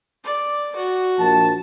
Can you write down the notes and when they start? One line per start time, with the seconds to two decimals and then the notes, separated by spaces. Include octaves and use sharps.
0.24 D5
0.76 F#4
1.19 A#1 A5